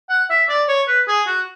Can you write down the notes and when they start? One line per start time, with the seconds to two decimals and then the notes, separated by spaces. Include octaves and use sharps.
0.09 F#5
0.30 E5
0.49 D5
0.68 C#5
0.87 B4
1.08 G#4
1.27 F#4